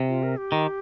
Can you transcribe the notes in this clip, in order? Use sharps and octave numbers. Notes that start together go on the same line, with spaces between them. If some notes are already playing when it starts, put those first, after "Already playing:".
Already playing: C3
F4
A#4
G4
D#3